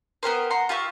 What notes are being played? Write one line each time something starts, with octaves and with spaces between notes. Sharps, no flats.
B3 G4 A#4 C5
F#5 A#5 C6
F4 G4 E5 C#6